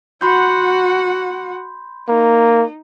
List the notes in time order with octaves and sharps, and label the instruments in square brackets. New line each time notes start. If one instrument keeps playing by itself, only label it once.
[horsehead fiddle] F#4 F#5 [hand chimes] B5 C6 G6
[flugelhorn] A#3 [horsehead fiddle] D#4